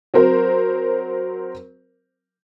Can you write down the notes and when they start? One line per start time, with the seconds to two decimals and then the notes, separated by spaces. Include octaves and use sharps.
0.14 F#3 C4 A#4 C5